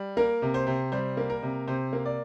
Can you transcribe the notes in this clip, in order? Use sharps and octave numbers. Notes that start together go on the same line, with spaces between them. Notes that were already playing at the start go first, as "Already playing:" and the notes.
Already playing: G3
A#3 A#4
C3
C5
C3
G3 C5
A#3
A#4
C3
C3 C5
A#3
D5